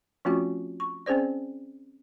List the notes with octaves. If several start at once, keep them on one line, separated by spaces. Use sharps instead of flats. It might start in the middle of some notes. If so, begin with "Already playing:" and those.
F3 A3 C4 C#4 F4 F#4
C#6
C4 C#4 G#4 C5 D5